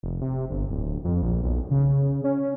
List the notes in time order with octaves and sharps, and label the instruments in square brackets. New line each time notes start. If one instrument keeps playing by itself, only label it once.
[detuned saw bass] F1
C3
G1
D1
F2
A#1
B1
C#3
C#4